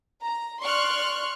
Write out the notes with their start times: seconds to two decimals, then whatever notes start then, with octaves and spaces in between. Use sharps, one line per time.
0.22 A#5
0.61 D5 C6 C#6 F6 F#6